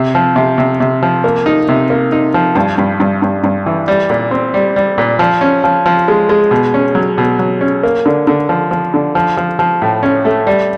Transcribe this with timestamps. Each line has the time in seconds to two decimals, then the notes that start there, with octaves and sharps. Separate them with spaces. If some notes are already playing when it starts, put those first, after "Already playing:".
Already playing: C3
0.15 F3
0.36 C3
0.58 C3
0.80 C3
1.03 F3
1.24 A#3
1.46 D#4
1.69 C3
1.90 A#3
2.12 D#4
2.34 F3
2.55 G2
2.78 G2
3.00 G2
3.22 G2
3.44 G2
3.66 E3
3.88 G3
4.10 A#2
4.31 C4
4.54 G3
4.76 G3
4.98 A#2
5.19 F3
5.41 C#4
5.64 F3
5.86 F3
6.08 G#3
6.29 G#3
6.51 B2
6.74 C#4
6.95 F#3
7.18 B2
7.39 F#3
7.61 C#4
7.83 A#3
8.06 D3
8.27 D3
8.49 F3
8.71 F3
8.94 D3
9.15 F3
9.37 F3
9.59 F3
9.82 A2
10.03 C#4
10.25 A3
10.47 G3